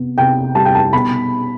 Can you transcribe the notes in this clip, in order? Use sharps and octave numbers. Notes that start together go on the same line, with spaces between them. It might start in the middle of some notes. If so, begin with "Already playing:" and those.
Already playing: C3 B3
C3 G5
G3 A5
G5
A5
B2 B5